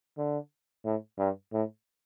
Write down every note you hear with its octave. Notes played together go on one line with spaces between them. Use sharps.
D3
A2
G2
A2